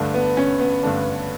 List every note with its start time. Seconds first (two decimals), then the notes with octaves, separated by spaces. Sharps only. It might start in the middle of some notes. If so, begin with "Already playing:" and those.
Already playing: G2 D3 A3 D4
0.14 B3
0.37 C#4
0.60 B3
0.83 G2 D3 A3 D4